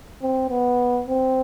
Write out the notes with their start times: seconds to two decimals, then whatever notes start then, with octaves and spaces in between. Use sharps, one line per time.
0.22 C4
0.50 B3
1.07 C4